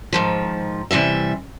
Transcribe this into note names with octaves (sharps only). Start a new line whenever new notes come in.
G#2 D#3 F3
C3 E3 G3 E5